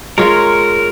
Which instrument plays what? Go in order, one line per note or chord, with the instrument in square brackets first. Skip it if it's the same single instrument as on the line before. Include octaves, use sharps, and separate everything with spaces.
[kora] G#3 F4 [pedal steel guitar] A#4 C#5